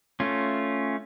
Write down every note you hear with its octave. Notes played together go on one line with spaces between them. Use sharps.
A3 C#4 F4